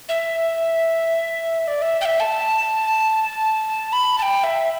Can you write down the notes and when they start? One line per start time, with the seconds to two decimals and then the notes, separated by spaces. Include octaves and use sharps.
0.09 E5
1.63 E5
1.68 D5
1.82 E5
2.01 G5
2.05 E5
2.20 A5
3.93 B5
4.18 A5
4.22 G5
4.44 E5